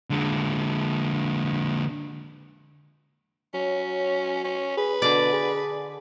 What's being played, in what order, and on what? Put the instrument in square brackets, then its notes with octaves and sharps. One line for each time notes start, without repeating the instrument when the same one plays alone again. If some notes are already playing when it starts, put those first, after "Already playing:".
[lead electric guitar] D3 G#3
[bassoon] F#3 [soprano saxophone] C#4
[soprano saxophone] C#4
[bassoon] G#4 [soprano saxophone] B4
[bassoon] B2 [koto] D3 D5
[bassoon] G#4